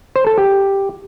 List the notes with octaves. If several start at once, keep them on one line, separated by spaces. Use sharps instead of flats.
C5
A4
G4